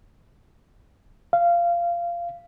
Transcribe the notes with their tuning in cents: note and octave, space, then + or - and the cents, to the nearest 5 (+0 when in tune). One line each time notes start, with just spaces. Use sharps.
F5 -20